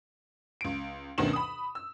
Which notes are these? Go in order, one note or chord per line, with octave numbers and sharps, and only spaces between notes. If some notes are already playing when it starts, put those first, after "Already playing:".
C#2 D7
D2 B2 D#3 C#4 E7 F#7
B5 D#6
E6